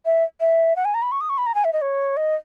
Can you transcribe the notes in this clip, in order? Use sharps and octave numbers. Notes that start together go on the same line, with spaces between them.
E5
E5
F#5
G#5
A#5
B5
C#6
D#6
C#6
B5
A#5
G#5
E5
D#5
C#5
D#5